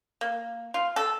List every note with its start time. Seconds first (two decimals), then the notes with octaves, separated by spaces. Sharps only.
0.21 A#3
0.74 F4
0.96 A4